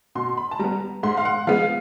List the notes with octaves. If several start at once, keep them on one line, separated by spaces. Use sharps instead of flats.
B2 C6
B5
A5
G3 B3 A#5
G#2 C6
F5
F#5
F3 G#3 B3 F5